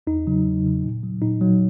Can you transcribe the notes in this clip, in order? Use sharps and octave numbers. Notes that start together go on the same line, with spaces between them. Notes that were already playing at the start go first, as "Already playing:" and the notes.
E2 D#4
C#3 F#3
E2
C#3 F#3
A#2
F#3
A#2 D#4
F#3